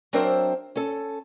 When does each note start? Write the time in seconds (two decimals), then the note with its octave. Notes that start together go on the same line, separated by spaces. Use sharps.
0.13 F#3 C4 D4 A#4 C5 E5
0.76 C#4 A4